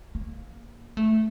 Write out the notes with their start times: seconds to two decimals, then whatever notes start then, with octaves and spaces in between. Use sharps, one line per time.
0.15 A#3
0.97 A3